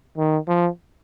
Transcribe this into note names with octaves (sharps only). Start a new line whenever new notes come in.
D#3
F3